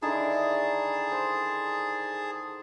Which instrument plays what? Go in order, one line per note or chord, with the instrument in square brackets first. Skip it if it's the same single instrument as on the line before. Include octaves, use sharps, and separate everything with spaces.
[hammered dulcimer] D3 D#3 E4 [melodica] G#4 A5
[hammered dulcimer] C5